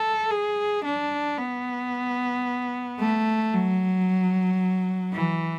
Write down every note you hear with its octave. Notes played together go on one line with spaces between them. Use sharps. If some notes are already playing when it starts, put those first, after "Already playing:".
Already playing: A4
G#4
D4
B3
A3
F#3
E3